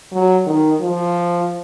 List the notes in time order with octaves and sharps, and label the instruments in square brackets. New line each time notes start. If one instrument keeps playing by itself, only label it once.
[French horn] F#3
D#3
F3